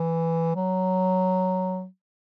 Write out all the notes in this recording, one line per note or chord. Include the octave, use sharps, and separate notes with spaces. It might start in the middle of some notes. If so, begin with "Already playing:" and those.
Already playing: E3
F#3